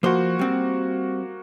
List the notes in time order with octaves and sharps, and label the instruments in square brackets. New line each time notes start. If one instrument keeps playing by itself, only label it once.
[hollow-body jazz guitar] F3 C5 [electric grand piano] A#3 F#4
[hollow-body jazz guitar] G3 C4